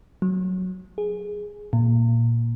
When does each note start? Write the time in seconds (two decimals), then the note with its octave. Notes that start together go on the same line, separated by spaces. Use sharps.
0.22 F#3
0.98 G#4
1.73 A#2